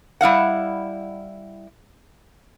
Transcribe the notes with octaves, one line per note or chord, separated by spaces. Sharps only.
G3 E4 F5 F#5